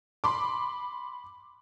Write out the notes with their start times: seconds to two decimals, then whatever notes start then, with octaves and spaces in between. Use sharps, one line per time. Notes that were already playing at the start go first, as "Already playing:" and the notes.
0.24 B5 C6 D6